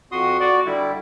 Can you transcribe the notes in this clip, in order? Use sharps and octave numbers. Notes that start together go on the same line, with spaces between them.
F2 F#4 C6 D#6
F#4 D5
D3 G3 E4